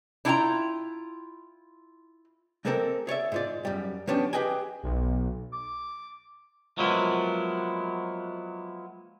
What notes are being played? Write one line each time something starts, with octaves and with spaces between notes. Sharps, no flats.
D4 E4 F4 F#5 G5 A#5
G#3 A#3 C4 A4 A#4
G#4 C#5 D5 E5
G#2 F4 D5
F#2 G3
F3 B3 C#4 D4 G4
G4 G#4 B4 D#5 G5 G#5
B1
D6
F3 F#3 G#3 A#3 B3 E4